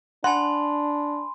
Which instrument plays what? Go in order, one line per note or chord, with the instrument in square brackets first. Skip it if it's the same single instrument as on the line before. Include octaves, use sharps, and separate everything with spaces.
[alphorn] D4 [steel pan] F#5 [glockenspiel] G#5 B5 C6